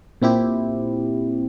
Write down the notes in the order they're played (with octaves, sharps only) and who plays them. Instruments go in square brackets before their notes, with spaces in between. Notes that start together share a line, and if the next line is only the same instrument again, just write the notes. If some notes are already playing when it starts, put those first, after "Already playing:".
[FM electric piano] A#2 C4 E4 G4